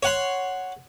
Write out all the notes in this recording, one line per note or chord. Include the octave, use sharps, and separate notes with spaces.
C#5 F#5 C6